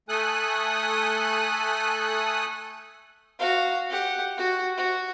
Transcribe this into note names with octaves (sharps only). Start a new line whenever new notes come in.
A3 A4 G#5 D#6 F#6
F#4 F5
G4 F#5
F#4
F#4